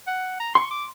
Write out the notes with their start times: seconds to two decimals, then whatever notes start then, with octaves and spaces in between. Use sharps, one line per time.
0.07 F#5
0.40 A#5
0.55 C6 C#6
0.71 D6